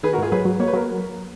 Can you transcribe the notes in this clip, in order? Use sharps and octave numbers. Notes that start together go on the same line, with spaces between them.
D#3 G#4 B4
F#4 A#4
G#2 F4 G#4
F#3 G#4 B4
F#3
A#3 C#5
B4
F#3 A#4